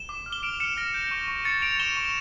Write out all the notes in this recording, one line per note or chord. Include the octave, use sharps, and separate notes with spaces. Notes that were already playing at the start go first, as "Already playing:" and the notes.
Already playing: E7 G7
D6
F6
G7
F6 D7 F7
F6 C#7 E7
F6 A#6 D7
G6
C#6
C#6
C#6 A6 C#7
C#6 D7 F7
C#6 E7 G7
C#6